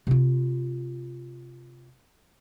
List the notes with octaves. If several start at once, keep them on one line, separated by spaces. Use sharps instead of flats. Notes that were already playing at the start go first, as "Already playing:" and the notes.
C3 F4